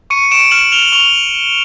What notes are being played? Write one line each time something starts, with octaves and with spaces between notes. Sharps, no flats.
C#6 C#7 D#7
C#6 D7 E7
F6 E7 F#7
F6 F7 G7
F#7
C#6 F7 G7